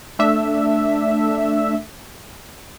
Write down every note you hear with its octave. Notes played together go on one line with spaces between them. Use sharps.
A3 D4 E5